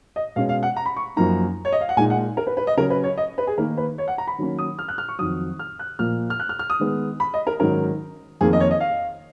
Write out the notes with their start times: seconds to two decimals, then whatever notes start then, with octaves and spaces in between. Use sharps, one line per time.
0.16 D#5
0.36 B2 G#3 C#4 F5
0.49 F5
0.63 F#5
0.76 A#5
0.86 B5
0.96 C#6
1.16 F#2 F3 A#3 D#4 A#5
1.65 C#5
1.73 D#5
1.81 F5
1.89 F#5
1.97 A#2 G#3 D#4 G#5
2.10 F#5
2.37 A#4
2.47 B4
2.57 B4
2.67 D#5
2.77 C#3 F#3 C#4 A#4
2.90 B4
3.04 C#5
3.18 D#5
3.38 B4
3.47 G#4
3.58 D#3 A#3 D#4 A#4
3.77 B4
3.98 C#5
4.08 F#5
4.18 A#5
4.27 B5
4.38 D#3 F#3 A#3 C#4
4.59 D#6
4.79 F6
4.88 F#6
4.98 F6
5.09 C#6
5.19 F2 D#3 F#3 D#6
5.59 F6
5.79 F#6
5.99 A#2 F3 A#3 F6
6.30 F6
6.40 F#6
6.49 F6
6.59 F6
6.70 D#6
6.80 D#3 G#3 B3
7.20 B5
7.34 D#5
7.47 A#4
7.60 G#2 D#3 F#3 C#4 A#4
8.41 F2 D#3 A#3 G#4
8.53 D#5
8.60 C#5
8.71 D#5
8.80 F5